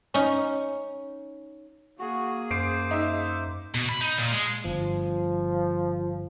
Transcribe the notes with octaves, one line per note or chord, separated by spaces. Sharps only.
C#4 D#4
A#3 F#4 G#4
F#2 C5 D6 C7 D7
D#4 E5
B2
B5
D#4
A#2
G#3
G1 F3